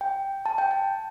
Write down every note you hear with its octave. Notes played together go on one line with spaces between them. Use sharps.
G5
A5
G5
A5